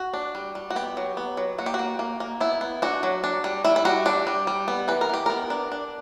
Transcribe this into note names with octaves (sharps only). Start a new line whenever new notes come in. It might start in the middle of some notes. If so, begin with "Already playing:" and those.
Already playing: F#4
D4
G3
G3
F#4
B3 G4
F#3
B3
F#3
A#3 F#4
G4
F#4
A#3
A#3
A#3
B3 E4
B3
D4 F#4
F#3
D4
G3
G3 E4
E4
G3 F#4
D4 G4
G3
G3
B3
E3 B4
A#4
E3 G4
B3 A#4
D4
D4